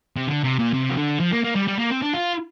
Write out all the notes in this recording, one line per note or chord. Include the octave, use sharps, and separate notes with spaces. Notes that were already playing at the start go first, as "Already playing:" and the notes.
C3
D3
C3
A#2
C3
F3
D3
F3
A#3
A#3
G3
G3
A#3
C4
D4
F4